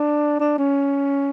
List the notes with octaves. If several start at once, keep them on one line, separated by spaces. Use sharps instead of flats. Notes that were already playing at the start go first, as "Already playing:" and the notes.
Already playing: D4
D4
C#4